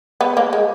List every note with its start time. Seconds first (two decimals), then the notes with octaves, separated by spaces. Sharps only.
0.21 B3
0.37 A#3
0.53 G#3